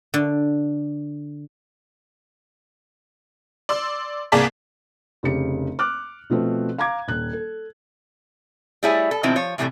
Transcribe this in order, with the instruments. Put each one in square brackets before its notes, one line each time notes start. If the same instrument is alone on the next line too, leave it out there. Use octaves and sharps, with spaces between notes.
[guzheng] D3
[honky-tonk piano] D5 C6 E6
C2 A#3 G#4 D5 A5 B6
[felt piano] F1 C#3 G4 C#7
D6 F6 F#6
B2 F3 A3 C4
F5 A#5 D6 G#6
D#1 F#6
A4
[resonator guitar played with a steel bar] G3 A3 E4 G#4 C#5 E5
A4
B2 D#3 F3 G#3 C4 E4
F3 C#5
A2 C3 E3 F3 G3 A3